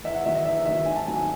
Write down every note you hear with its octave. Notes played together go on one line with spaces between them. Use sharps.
E2 E5
F#5
D#3 F#3 E5
D#5
E2 E5
D#3 F#3 E5
G#1 G#5
A5
G#2 F#3 G#5
G#5